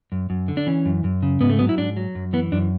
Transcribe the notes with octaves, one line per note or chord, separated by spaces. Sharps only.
F#2
F#2
D3
D4
E3 C#4
F#2
F#2
C#3
G#2 B3
A3
F#3 B3
E4
G#2 D4
F#3
F#2
E3 B3
F#2 D4